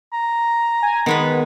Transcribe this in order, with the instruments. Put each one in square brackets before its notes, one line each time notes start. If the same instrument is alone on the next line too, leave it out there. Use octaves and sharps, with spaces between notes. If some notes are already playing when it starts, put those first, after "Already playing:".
[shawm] A#5
[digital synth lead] G#5
[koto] D#3 G#3 B4 [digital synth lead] B3